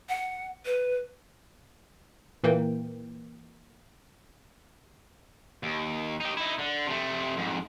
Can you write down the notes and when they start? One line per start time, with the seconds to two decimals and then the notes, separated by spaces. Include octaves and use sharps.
0.09 F#5
0.65 B4
2.43 A#2 E3 A#3 G5
5.63 D#2
6.20 D#4 G4
6.37 D#4 E4
6.59 D3
6.87 C3 A3
7.37 F2 G#2